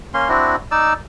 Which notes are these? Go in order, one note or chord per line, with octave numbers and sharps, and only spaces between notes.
A#3 C#4 C6
C4 D4 E4 F#4
D#4 D5 E6